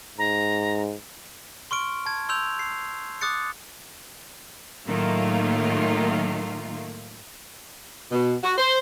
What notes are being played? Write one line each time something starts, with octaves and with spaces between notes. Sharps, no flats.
G#2 A#5
C6 C#6 F6 D7
A5 G#6
C6 E6 G6 F7
C7
D6 D#6 F#6 A6 C#7
A2 D#3 F#3 A3 A#3 F4
B2
F#4
C5